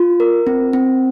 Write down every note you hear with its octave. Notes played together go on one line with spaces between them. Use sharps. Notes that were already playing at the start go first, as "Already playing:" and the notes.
Already playing: F4
A#4
C4
C4